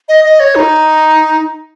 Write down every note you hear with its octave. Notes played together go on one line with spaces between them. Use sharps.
D#5
D#5
C#5
D#4